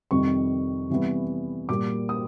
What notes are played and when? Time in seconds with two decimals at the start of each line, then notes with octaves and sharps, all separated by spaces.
0.11 F2 C3 D#3 G3 C#6
0.90 C3 E3 G3 B3
1.69 A#2 G3 A#3 D6
2.09 D#6